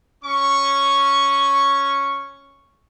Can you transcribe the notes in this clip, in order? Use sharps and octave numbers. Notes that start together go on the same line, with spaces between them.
C#4 C#6